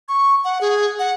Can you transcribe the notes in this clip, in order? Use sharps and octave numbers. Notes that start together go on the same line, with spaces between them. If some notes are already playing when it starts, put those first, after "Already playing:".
C#6
F#5
G#4
F#5